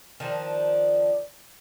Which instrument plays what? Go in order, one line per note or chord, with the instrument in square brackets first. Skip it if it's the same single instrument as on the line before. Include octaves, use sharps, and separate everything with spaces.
[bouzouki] D#3 F3 D4